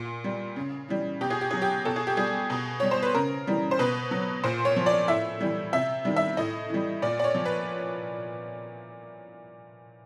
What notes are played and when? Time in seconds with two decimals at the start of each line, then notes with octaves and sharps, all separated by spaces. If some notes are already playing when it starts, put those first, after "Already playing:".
Already playing: A#2
0.24 G3
0.56 C#3
0.89 E3 G3
1.21 B2 G4
1.30 G#4
1.41 G4
1.51 F#3 G#4
1.62 G4
1.85 B2 A4
1.96 G#4
2.07 G4
2.17 G3 G#4
2.50 B2
2.80 G3 C#5
2.91 C5
3.03 B4
3.14 C#3 A#4
3.47 E3 G3
3.71 C5
3.79 B2 B4
4.11 F#3
4.44 A#2 C5
4.65 C#5
4.76 F3
4.86 D5
5.08 A2 E5
5.41 E3 G3
5.73 C3 E5
6.05 D#3 G3
6.16 E5
6.37 A2 D#5
6.70 E3 G3
7.02 A#2 D5
7.19 D5
7.24 C#5
7.35 F3
7.45 B4